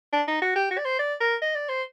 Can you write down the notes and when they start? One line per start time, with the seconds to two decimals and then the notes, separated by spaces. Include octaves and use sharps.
0.13 D4
0.28 D#4
0.42 F#4
0.56 G4
0.71 F#4
0.78 D5
0.85 C5
0.99 D5
1.20 A#4
1.42 D#5
1.55 D5
1.69 C5